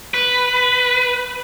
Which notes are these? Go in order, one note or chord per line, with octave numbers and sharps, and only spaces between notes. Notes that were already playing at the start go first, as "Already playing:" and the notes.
B4